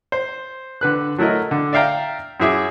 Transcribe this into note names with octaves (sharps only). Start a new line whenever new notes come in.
C5
D3 B4 F#6
F#3 A3 E4 A#4 D#5
D3
D5 E5 F5 G5 A#5
F#2 E4 G#4 E5 D6